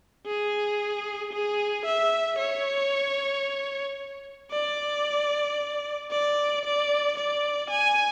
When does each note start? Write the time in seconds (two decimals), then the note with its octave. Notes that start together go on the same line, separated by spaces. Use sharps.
0.26 G#4
1.33 G#4
1.86 E5
2.39 C#5
4.52 D5
6.11 D5
6.65 D5
7.18 D5
7.70 G#5